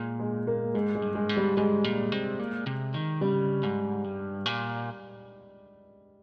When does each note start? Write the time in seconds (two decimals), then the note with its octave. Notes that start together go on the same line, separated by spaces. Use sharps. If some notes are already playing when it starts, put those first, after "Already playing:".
Already playing: A#2 G#3
0.20 G#3
0.47 A#3
0.75 G#2 G#3
0.95 G#3
1.02 G2
1.15 G#3
1.29 G#2
1.37 G3
1.57 G#2 G#3
1.84 A#2
2.12 C3
2.39 A#2
2.67 C3
2.94 D#3
3.21 C#3 G3
3.63 G#2
4.04 G2
4.46 A#2